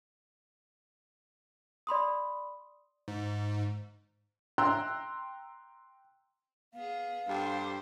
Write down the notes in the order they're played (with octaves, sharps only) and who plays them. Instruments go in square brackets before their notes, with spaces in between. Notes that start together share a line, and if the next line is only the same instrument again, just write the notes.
[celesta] D5 B5 C6 D#6
[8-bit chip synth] G#2
[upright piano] G5 A#5 C6 E6 F#6
[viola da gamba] B3 G#4 [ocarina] F5
[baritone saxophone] G2 [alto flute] G4 [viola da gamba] A4 C5